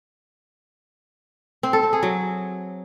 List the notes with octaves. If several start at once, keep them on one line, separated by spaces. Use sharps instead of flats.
C4
A4
C4
G#4
F#3